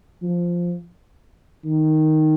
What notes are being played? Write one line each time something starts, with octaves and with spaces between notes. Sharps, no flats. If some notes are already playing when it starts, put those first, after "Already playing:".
F3
D#3